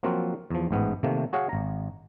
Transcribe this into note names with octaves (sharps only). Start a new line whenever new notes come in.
F3 F#3 A#3 C4 F4 F#4
E2 F3
A1 G#2 B3
C3 D#3 A3 A#3
F#4 G#4 C#5 F5 F#5
G#1 A#5